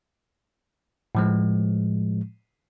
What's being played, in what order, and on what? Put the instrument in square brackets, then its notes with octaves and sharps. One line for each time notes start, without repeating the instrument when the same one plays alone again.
[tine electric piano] A2 F3 G#3